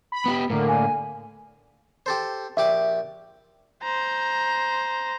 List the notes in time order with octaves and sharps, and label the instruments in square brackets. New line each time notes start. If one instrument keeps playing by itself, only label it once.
[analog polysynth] B5
[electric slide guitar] B3 F#4 G4
[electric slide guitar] A2 [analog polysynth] D3 A#3
[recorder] G#5
[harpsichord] G4 A4 C5
[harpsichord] A#1 G4 D6 [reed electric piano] E5
[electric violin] C5 A#5